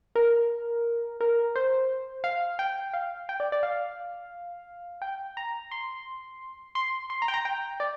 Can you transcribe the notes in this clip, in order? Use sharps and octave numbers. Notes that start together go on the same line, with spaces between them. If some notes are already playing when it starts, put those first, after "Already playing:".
A#4
A#4
C5
F5
G5
F5
G5
D5
D5
F5
G5
A#5
C6
C6
C6
A#5
G5
A#5
G5
D5